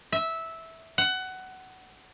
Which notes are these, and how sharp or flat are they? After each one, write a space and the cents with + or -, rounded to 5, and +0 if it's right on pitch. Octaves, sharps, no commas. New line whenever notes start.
E5 -10
F#5 +20